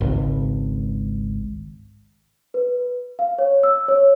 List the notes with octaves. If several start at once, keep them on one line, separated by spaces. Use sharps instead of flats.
G#1 C#2
B4
F5
C#5
E6
C#5